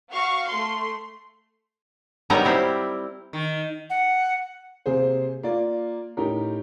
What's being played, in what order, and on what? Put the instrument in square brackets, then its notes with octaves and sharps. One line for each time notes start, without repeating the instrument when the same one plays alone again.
[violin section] F#4 F5 C#6
A3 C6
[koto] F#3 G3 B3 D#4 A#4
C4 E4 G4
[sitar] D#3
[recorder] F#5
[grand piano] C3 A#3 G#4 C5
A#3 F4 D5
A2 C#4 D#4 G4 A#4